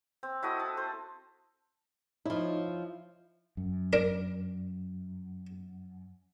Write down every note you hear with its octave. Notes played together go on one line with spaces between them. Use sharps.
C4
E4 F#4 A4 D#5
A5
A4 C5
F3 D#4 E4 C#5 D#5
F#2
D4 A#4